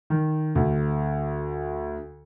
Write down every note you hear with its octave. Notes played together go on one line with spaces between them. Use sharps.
D#3
D2